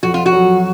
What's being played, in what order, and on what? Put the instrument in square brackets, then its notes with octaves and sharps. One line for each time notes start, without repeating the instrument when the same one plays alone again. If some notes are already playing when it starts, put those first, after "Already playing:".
[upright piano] F2 [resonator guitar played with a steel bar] F#4
[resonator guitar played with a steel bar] F4
F#4
[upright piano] F#3